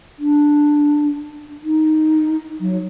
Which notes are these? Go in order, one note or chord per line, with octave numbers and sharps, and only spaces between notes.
D4
D#4
F#3